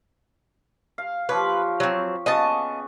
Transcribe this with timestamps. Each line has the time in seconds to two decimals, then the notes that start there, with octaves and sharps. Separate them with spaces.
0.98 F5
1.29 F3 G4 B4 C#5
1.80 F#3 C4
2.26 C#3 B3 D#5 A5 C#6